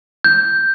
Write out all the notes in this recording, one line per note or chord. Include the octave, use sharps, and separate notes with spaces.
G6